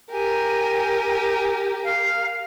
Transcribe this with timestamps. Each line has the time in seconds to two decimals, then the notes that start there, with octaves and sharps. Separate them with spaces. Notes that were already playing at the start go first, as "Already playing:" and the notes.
0.12 G4 A#4 G#5
1.84 F5